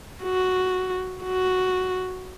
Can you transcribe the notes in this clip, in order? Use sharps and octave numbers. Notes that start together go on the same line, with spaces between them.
F#4
F#4